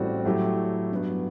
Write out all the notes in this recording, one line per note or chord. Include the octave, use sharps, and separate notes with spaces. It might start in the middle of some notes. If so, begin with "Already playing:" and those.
Already playing: A1 A2 G3 C4 F#4
A2 F#3 A3 E4 G4
G2 F#3 B3